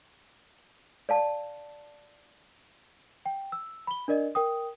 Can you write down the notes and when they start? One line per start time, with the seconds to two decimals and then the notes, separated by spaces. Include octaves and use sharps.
1.09 D5 F5 A5
3.26 G5
3.52 E6
3.87 B5 G7
4.08 D4 A#4 D5 D#5
4.35 A#4 G5 D#6